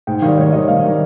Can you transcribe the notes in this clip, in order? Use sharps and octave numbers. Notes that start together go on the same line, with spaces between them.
G#2 G5
D#3 G3 F5
G#2 C#5
D#3 G3 D#5
G#2 F5
D#3 G3